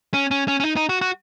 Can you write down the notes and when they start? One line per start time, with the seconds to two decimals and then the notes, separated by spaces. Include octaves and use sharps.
0.14 C#4
0.31 C#4
0.48 C#4
0.60 C#4
0.64 D#4
0.76 D#4
0.89 F#4
1.01 F#4